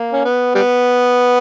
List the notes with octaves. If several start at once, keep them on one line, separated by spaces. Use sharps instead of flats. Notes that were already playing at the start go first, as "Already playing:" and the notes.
Already playing: A#3
C#4
B3
G3 B3